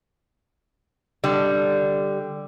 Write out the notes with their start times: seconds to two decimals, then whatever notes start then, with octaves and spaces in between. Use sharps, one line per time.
1.24 D3 G3